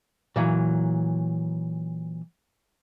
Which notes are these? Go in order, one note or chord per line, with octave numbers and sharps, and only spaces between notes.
A#2 E3 F#3